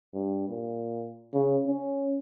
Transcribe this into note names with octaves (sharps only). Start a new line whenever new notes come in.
G2
A#2
C#3
C#4